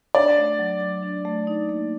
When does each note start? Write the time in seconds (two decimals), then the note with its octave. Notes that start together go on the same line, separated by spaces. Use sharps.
0.15 D4 D5
0.37 A3
0.59 F#3
0.81 F#3
1.03 D4
1.25 A3
1.47 D#4
1.69 A#3